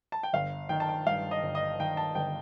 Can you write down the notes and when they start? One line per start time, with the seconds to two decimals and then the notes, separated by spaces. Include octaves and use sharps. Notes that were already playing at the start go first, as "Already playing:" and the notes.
0.12 A5
0.23 G5
0.33 G1 F5
0.69 D#3 G5
0.80 A5
0.89 G5
1.06 G2 F5
1.31 D#5
1.43 G1
1.55 D#5
1.80 D#3 G5
1.97 A5
2.15 G1 G5